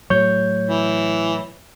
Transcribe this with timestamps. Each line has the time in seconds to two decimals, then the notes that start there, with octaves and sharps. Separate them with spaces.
0.10 A2 F#3 C#5 G6
0.69 E3